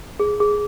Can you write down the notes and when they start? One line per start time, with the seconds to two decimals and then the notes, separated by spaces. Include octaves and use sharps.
0.20 G#4
0.40 G#4